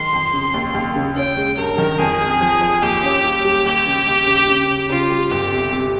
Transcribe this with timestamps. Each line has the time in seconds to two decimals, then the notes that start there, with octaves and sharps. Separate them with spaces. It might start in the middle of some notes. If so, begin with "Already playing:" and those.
Already playing: D#3 G#3 C6
0.13 F2
0.33 C#3
0.54 D#2
0.75 D#2
0.96 C#3
1.16 C#4 G5
1.37 G#3
1.58 G2 A#4
1.78 D#3
1.99 F2 G#4
2.20 G#3
2.41 F3
2.61 F3
2.82 D#2 G4
3.03 C#4
3.24 G3
3.45 G3
3.65 D#2 G4
3.86 C#3
4.07 D#2
4.27 C#3
4.48 C#3
4.69 C#3
4.90 C#3 F4
5.10 G3
5.31 G1 G4
5.52 C3
5.73 C3